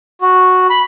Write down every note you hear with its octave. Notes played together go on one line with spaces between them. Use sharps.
F#4
B5